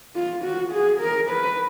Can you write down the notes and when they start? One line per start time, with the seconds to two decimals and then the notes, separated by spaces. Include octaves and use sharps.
0.16 F4
0.44 F#4
0.73 G#4
1.00 A#4
1.30 B4